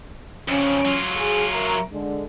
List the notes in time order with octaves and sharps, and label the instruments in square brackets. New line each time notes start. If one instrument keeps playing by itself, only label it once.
[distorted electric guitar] F2 C#3 [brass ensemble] C#4
[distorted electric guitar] F#3 F4
[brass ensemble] G#4
A#4 E5 A#5
D3 G#3 D4